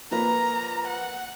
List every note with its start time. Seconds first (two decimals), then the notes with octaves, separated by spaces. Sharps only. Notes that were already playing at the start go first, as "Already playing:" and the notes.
0.11 F3 A#3 B4 A#5
0.88 F#5